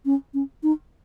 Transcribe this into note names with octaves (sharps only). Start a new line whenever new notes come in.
C#4
C#4
D#4